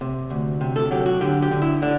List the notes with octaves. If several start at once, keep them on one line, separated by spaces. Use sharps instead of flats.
C3
D2
C3
A4
F#3 G4
F#4
D3 G4
G4
D3
E4
D3 D4